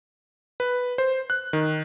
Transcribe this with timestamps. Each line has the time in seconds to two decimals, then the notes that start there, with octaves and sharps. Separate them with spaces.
0.60 B4
0.98 C5
1.30 F#6
1.53 D#3